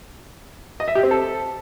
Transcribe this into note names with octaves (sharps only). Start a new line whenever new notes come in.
D#5
E5
G4
C4
A4